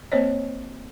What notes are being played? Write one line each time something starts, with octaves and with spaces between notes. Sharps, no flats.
A#3 C4 C5 C#5 D#5